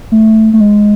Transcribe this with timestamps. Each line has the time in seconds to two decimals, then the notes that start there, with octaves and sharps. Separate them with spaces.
0.12 A3
0.53 A3
0.60 G#3